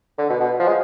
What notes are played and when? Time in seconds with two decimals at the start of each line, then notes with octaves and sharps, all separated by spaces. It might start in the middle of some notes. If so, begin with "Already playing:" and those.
0.18 D3
0.30 B2
0.40 B2
0.59 F3
0.68 G#3